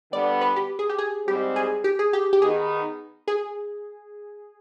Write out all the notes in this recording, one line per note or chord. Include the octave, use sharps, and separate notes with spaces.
D3 G3 B3 D5
B4
G4
G#4
G4
G#4
G#2 G3 C4 G4
G#4
G4
G#4
G4
G4
D#3 B3 D#4 G#4
G#4